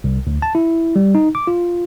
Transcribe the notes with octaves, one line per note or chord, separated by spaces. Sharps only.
C2
D2
A5
E4
G3
D#4
D6
F4